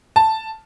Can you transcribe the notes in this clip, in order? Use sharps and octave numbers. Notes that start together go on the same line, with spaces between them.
A5